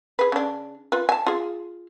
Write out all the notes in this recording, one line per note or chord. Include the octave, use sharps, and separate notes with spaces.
G#4 B4
C#3 D4
F4 B4
G#5 A5
F4 G#4